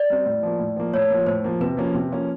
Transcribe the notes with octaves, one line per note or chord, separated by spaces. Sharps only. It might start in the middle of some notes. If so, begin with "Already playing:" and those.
Already playing: D5
G3 C4
A2
F3 A#3
A2
F3 A#3
A2 C#5
F3 A#3
A2 C5
F3 A#3
C3 B4
F3 A#3 C#4
C3
F3 A#3 C#4